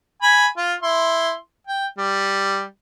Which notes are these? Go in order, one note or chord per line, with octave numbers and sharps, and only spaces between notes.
G#5 B5
F4
E4 C6
G5
G3